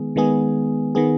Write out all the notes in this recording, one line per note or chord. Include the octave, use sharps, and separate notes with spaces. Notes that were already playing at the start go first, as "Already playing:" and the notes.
Already playing: D#3 G#3 B3 G#4
D#3 G#3 B3 G#4
D#3 B3 G#4